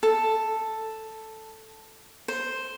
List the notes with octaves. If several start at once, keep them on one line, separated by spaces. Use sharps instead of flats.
A4
C5